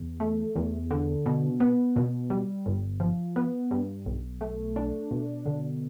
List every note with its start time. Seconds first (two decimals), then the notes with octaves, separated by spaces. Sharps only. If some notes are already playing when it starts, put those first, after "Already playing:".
Already playing: E2
0.20 A3
0.56 E2
0.91 D3
1.26 B2
1.60 B3
1.96 B2
2.30 G3
2.66 G1
3.00 F3
3.36 B3
3.71 G2
4.06 B1
4.41 A3
4.76 D4
5.11 B2
5.46 D3